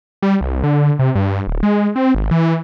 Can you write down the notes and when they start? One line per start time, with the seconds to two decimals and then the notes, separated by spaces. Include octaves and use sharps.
0.22 G3
0.41 C2
0.64 D3
0.99 C3
1.15 G2
1.47 D1
1.63 G#3
1.96 C4
2.15 G#1
2.31 E3